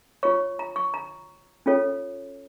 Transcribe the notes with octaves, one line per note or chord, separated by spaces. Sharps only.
F4 C#5 C#6
A#5
C#6
A#5
C#4 F4 A4 C#5